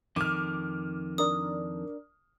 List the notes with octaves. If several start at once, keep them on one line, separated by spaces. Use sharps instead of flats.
F2 D#3 D6 F6
D4 A#4 D5 D#6